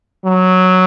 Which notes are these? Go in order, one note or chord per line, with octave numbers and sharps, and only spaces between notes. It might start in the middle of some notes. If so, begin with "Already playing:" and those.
F#3